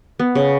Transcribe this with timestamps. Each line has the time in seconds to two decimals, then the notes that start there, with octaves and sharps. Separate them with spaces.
0.19 B3
0.35 C#3